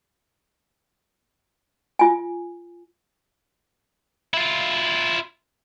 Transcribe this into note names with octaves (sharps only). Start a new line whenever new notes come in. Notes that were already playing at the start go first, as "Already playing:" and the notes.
F4 G#5
E4 F4